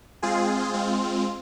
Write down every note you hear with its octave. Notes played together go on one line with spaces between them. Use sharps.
G#3 C4 F4 G#4
G#3 C4 F4